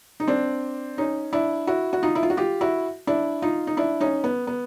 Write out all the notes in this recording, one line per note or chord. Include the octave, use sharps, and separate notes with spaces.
D#4
C4 D4
C#4 D#4
D4 E4
E4 F#4
F#4
D#4 F4
E4
F4
F#4
F4 G4
E4 F#4
D4 E4
D#4 F4
D#4
D4 E4
C#4 D#4
B3
B3